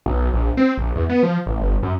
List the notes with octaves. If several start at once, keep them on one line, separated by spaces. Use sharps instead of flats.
B1
A#1
C4
A#1
E2
B3
F3
A1
G1
F#2